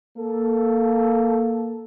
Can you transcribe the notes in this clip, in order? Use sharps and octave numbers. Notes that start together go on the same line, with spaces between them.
A#3 A4